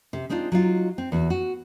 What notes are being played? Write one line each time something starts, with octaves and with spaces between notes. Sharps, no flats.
C3
G#3 C4 D4 D#4 F4
F#3 D#4 F4
C4
E2 F#4
F#4